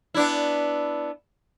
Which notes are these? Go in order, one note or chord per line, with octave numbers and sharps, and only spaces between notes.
B3 D4 E4